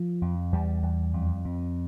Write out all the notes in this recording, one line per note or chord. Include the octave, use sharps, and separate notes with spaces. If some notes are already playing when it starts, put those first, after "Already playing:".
Already playing: F3
F2
E2 G3
E2
F2
F2